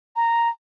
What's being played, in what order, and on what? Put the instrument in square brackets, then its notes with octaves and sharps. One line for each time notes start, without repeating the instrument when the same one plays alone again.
[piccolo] A#5